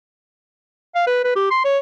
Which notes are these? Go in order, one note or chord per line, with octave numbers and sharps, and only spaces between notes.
F5
B4
B4
G4
C6
C#5